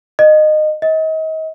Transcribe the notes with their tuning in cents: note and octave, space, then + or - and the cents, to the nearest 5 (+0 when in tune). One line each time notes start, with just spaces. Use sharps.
D#5 -20
D#5 +35